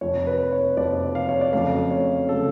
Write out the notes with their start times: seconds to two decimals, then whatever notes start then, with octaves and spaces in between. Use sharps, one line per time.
0.01 F1 F2 F3 C#5
0.27 B4
0.52 C#5
0.77 F1 F2 F3 D5
1.15 F5
1.29 C#5
1.41 D5
1.52 F2 C#3 F#3 A3 F5
1.91 C#5
2.29 C#3 F#3 A3 A4